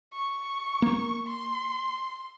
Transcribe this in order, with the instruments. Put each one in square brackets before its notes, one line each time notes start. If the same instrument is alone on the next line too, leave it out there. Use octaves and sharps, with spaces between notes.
[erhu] C#6
[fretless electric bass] A#3
[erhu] C6